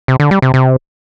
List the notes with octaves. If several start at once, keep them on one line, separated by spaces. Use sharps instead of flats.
C3
D3
G3
C3
C3